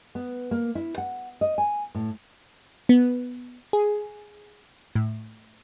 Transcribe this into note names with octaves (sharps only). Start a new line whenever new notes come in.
B3
A#3
E4
F#5
D#5
G#5
A2
B3
G#4
A2